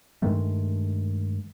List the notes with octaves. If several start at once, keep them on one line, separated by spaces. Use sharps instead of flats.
G2 D#3 G#3 A3